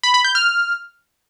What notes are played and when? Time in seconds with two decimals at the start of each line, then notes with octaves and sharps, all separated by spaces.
0.03 B5
0.14 B5
0.24 G6
0.35 F6